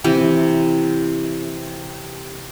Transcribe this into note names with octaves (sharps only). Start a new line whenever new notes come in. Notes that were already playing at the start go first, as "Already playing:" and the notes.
C3 E3 G4